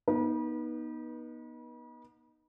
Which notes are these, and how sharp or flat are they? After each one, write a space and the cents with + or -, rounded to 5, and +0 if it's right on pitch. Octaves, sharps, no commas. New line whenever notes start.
B3 -30 D#4 +0 B4 -40